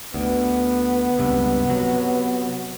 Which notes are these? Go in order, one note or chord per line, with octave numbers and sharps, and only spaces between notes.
D2 B3
C#2 G2 C3
C3 F#3